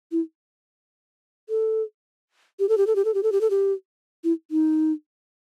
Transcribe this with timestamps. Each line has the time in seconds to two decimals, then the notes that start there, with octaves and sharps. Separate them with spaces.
0.12 E4
1.49 A4
2.59 G4
2.69 A4
2.78 G4
2.87 A4
2.96 G4
3.05 A4
3.14 G4
3.23 A4
3.32 G4
3.41 A4
3.50 G4
4.24 E4
4.51 D#4